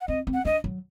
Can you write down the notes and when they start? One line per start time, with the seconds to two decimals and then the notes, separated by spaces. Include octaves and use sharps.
0.01 F#5
0.08 C4 D#5
0.27 C4
0.34 F#5
0.45 D4 D#5
0.64 F#3